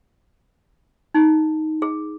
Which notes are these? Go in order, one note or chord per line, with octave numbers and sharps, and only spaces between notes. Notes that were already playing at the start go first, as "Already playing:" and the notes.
D#4
G#4